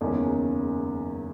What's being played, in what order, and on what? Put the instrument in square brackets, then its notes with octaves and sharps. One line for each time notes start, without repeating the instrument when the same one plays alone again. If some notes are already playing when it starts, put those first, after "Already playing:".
[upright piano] F#1 E2 D#3 G#3 C#4